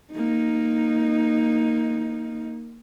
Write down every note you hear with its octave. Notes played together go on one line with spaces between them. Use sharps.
A#3 D#4